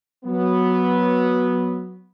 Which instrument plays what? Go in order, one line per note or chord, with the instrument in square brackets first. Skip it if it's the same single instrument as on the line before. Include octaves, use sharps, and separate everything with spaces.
[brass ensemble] F#3 B3